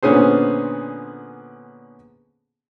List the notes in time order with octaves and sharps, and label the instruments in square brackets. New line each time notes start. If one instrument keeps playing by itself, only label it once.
[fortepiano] A#2 D3 B3 C#4 G#4 C5